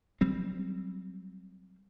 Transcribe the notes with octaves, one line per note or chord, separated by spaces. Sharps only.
F#3 G3 C4